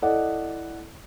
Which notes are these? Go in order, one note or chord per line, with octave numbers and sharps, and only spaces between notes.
E4 A4 D5 D#5 F#5